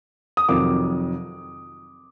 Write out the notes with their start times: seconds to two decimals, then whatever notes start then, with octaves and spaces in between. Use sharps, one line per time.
0.37 D#6
0.49 F2 C3 D#3 F#3 D6